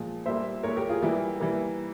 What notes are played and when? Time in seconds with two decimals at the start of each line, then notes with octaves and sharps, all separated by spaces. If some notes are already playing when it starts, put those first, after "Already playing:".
Already playing: A#2 F3 G#3
0.26 A#2 G3 A#3 C5 E5
0.63 A#2 G#3 A#4 C#5
0.76 G4 A#4
0.89 F4 G#4
1.02 E3 G3 A#3 E4 G4
1.40 E3 G3 A#3